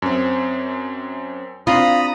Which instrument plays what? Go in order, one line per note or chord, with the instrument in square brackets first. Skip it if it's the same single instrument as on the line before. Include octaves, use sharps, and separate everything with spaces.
[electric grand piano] F#2 C4
[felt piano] C4 D4 [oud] F4 [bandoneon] A#5 B5 D#6